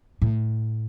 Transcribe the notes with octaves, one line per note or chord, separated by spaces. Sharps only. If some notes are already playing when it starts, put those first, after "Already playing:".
A2